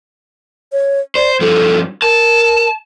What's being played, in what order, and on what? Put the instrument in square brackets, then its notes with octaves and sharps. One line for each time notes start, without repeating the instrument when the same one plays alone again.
[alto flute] C#5
[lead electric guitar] C5 [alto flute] D5
[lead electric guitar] G2 F3 [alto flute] A4
[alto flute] A#4 [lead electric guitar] A5